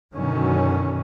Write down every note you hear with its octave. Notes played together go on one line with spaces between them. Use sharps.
F#2 B2 D3 D#3 F#3 C#4